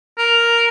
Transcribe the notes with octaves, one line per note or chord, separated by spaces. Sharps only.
A#4